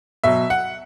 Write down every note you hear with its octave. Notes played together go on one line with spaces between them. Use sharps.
B2 F#3 E5
F#5